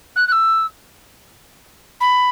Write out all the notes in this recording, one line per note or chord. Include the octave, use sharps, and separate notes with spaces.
F#6
F#6
E6
B5